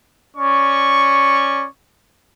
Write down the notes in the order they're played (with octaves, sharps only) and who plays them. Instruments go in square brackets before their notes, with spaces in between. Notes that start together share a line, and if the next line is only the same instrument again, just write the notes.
[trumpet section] C#4 D5 C#6